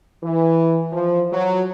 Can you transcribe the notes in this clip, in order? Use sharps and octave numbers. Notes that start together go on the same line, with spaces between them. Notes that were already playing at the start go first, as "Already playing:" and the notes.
E3
F3
F#3